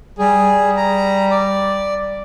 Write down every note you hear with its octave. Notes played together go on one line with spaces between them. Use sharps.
G3 G#4
A#5
D5